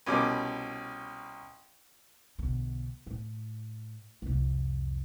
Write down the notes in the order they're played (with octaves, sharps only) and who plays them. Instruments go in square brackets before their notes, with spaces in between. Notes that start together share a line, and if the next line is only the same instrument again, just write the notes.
[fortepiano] C2 B2 C#4 D6
[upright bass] B1 D3
A2
C2 F2